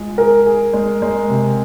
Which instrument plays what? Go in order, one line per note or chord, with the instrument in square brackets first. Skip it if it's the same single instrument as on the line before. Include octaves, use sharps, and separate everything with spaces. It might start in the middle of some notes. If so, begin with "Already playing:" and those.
Already playing: [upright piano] G#3 F4
[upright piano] G#4 [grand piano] A#4
[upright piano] G#4
G#3
G#3
C3